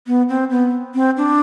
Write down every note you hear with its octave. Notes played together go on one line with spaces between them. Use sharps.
B3
C4
B3
C4
D4